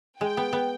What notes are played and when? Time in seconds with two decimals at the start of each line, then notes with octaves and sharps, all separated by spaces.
0.20 G#3 G5
0.37 B3
0.53 B3